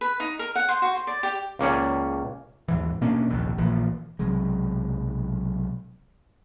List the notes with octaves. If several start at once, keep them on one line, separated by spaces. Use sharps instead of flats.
B4
D#4
A#4
F#5
C5
F#4
C5
D5
G4
C#2 A#3 C#4 D5
D#2 G#2 E3
B2 A#3 C#4 D4
F1 A#1 D#2
A#1 A#2 E3 F3
B1 C3 F#3 G#3